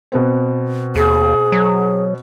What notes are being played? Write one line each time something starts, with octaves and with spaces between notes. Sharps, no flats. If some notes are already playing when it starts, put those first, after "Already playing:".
B2 B3 C4
D#2 G#4
F#3